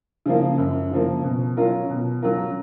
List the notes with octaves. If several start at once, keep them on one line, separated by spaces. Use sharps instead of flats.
C#3 F3 A#3
F#2
C#3 F3 A#3
B2
F#3 C#4 F4 A#4
B2
F#3 C#4 F4 A#4